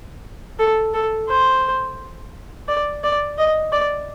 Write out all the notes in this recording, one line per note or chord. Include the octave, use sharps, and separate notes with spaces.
A4
A4
C5
D5
D5
D#5
D5